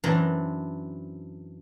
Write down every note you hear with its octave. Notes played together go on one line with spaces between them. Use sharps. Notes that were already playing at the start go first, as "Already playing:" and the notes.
F#2 E3 C4 D4 A#5